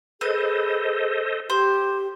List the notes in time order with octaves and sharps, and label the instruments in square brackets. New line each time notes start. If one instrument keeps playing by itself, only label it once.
[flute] G#4 [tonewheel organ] A4 C5 D#5 [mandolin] B4
[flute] G4 [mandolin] C5